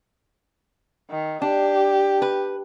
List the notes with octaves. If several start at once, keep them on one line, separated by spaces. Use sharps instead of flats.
D#3
D4 G4
B4